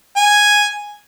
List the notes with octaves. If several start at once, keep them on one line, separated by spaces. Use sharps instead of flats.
G#5